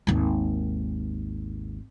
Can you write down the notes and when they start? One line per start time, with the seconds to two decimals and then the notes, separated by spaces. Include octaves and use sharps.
0.07 G#1 D#2